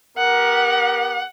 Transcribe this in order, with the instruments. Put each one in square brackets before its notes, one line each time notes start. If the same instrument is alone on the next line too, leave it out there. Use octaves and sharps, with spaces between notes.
[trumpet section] B3 G4 A#4 [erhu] F#5